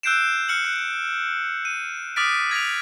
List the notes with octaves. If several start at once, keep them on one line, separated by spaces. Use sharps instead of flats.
E6 F#6 G6 C7 D7 E7
F6 C#7 F#7
F#6
D#7
D6 D#6 F6 A6 B6 D7
G#6 A#6 D7 F7